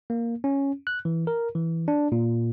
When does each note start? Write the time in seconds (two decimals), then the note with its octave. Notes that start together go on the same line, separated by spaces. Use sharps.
0.10 A#3
0.44 C#4
0.87 F#6
1.05 E3
1.27 A#4
1.55 E3
1.88 D4
2.12 A#2